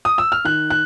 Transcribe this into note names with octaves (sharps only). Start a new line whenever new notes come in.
D#6
E6
F6
D#3 F#6
F#6